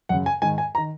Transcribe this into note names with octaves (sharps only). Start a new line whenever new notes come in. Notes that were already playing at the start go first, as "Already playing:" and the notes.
F#2 C#3 F#5
G#5
G#2 D#3 G#5
G#5
A#5
D#3